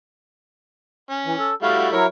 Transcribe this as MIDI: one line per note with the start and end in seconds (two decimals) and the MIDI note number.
1.11 1.49 61
1.26 1.36 52
1.39 1.55 69
1.63 1.92 55
1.63 1.92 57
1.63 1.92 64
1.63 1.88 66
1.63 1.88 77
1.93 2.07 54
1.93 2.07 64
1.93 2.07 70
1.93 2.05 73